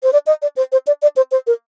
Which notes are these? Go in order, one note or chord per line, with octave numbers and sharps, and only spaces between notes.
C5
D5
D#5
D5
C5
C5
D5
D5
C5
C5
A#4